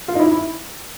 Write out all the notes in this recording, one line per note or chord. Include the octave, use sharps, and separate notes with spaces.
F4
D#4
E4
E4